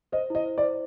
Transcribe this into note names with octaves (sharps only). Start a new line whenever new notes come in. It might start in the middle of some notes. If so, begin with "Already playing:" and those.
C5 D#5
E4 D#5
C5
D5
C5